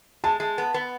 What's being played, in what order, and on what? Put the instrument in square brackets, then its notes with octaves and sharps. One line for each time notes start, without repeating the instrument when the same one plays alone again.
[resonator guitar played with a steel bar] G#3 [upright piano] A5
[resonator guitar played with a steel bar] G#3
B3
B3